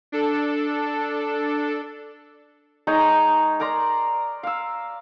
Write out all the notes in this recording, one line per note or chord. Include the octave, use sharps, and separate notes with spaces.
D4 A4
G#3 D#4 C#5 A#5
A#4 D5 A#5 C6
F5 E6